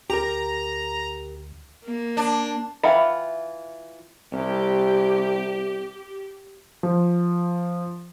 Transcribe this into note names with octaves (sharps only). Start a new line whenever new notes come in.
D2 G4 A#4 A#5
A#3
D4
E3 F4 E5 F#5 B5
C2 G4
F3